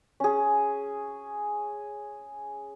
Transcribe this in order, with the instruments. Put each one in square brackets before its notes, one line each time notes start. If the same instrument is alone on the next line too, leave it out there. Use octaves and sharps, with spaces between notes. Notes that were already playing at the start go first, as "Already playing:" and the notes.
[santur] C#4 G#4